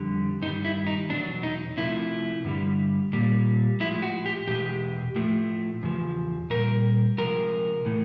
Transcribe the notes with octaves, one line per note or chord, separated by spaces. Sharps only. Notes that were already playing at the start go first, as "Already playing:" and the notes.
Already playing: F2 D3 G3
G2 D#3 G3 D#4
E4
D#4
E2 B2 F#3 D4
D#4
C3 F3 A3 E4
G2 D3 G3
A#2 G3
A2 F3 G#3 E4
F#4
G4
E2 B2 G#3 G4
A2 F3 A3
E2 C#3 F3
A#2 G3 A#4
C3 F3 G#3 A#4
A2 E3 A3